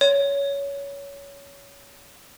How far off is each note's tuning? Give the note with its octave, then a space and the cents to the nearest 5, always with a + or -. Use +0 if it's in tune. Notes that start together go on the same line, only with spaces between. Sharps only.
C#5 +20